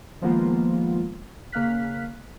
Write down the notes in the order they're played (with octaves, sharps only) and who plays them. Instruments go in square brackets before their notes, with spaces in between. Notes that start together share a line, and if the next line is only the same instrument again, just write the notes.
[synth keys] D#3 F3 G#3 A#3 B3 F4
C#3 A#3 F5 F6 F#6 B6